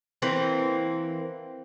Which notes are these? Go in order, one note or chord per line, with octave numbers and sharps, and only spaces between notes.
E3 A#3 C4